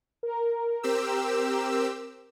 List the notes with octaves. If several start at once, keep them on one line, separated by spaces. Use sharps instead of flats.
A#4
C4 G4 E6